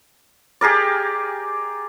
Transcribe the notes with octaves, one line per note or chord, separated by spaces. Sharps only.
G4 G#4 A#4 D5